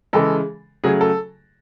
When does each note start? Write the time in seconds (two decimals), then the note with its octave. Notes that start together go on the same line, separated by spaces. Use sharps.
0.13 C#3 E3 G#3 A4
0.84 C#3 F#3 A3 G#4
1.01 A4